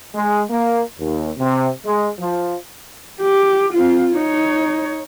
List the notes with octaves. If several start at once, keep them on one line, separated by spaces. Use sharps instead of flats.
G#3
A#3
D#2
C3
G#3
F3
G4
C4 F4
D#4 C#5